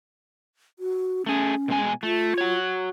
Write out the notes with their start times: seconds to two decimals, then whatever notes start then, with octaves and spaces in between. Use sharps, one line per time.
0.79 F#4
1.26 A3 C#4 G#4
1.68 B2 G#3 G#5
2.03 A3 F4
2.38 F#4 C#5